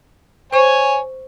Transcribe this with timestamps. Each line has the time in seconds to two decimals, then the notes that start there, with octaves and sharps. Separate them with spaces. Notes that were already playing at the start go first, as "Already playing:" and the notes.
0.53 C5 C#5 G#5 C#6